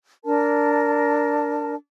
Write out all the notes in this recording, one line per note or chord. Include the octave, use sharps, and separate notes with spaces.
D4 A#4 A5